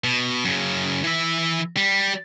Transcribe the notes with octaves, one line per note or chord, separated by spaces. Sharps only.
B2
F#2 C#3
E3 E5
G3